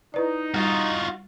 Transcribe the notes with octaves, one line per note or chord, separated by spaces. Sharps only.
D#4 E4 B4 D5
G3 F4 F#4